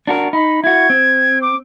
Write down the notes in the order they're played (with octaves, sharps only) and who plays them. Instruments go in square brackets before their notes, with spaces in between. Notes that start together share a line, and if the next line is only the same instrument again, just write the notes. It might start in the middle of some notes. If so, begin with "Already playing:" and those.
[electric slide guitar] D4 F#4 A#4
[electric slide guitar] D#4 [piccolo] B5
[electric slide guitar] E4 F#4 [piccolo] G#6
[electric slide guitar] C4
[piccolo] D6